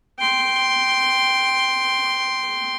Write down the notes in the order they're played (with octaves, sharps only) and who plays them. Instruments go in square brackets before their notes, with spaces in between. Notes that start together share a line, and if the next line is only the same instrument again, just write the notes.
[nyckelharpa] G5 C6